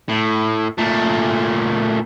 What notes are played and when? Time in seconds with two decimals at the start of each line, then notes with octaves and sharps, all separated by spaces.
0.09 A2
0.78 A#2 A3